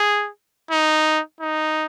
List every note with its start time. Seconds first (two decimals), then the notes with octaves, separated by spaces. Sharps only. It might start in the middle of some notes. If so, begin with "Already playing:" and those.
Already playing: G#4
0.71 D#4
1.41 D#4